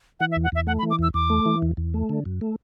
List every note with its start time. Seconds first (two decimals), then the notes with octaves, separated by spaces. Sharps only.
0.20 E3 F#5
0.32 E5
0.36 E2
0.44 F#5
0.52 E2 E5
0.67 A3 F#5
0.79 B5
0.83 E3
0.90 D6
0.99 E2 E6
1.14 E2 D6
1.30 A3
1.46 E3
1.62 E2
1.77 E2
1.94 A3
2.09 D3
2.25 F#2
2.41 A3